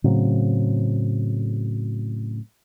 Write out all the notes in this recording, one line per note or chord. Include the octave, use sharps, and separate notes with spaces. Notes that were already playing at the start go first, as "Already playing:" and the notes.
A2 C#3 F#3 C4